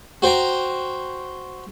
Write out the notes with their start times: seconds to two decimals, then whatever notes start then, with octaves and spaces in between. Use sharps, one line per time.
0.22 F#4 C5 G5 A#5